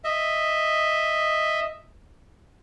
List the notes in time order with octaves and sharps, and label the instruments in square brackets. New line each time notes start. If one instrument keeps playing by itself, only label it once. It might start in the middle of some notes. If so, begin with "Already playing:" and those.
[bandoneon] D#5 E5